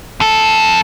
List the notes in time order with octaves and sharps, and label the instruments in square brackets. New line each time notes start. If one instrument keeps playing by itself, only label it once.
[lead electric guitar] F2 A4